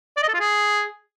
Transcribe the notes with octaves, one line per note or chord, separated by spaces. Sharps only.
D5
D#5
A4
F4
G#4